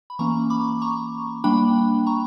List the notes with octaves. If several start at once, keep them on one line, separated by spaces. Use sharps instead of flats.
B5
E3 A#3 C#4 A#5 C#6
B5 D6
A#5 C#6
G3 A#3 D4 G5 B5
A#5 C#6